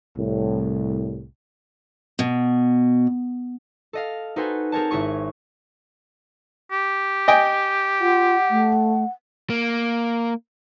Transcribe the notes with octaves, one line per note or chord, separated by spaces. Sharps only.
C2 A2
B2
A4 D#5 F5
D#4 F#4 A4 B4 C5 G#5
C4 G#4 A#4 C#5 A5
G#1 E4 G#4 C#6
G4
D#5 G5 G#5
F4 F#5
A3
A#3